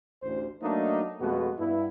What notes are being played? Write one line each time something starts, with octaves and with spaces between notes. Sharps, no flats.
A1 D2 C5
F#3 A3 A#3 D4 D#4
F2 B2 G#3 A3 B3 F#4
G2 B3 E4